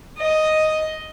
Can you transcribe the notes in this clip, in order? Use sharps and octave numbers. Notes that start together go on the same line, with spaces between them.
D#5